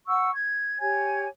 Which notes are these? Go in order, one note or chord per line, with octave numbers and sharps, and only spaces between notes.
F#5 C#6 E6
G#6
G4 C#5 G#5 G#6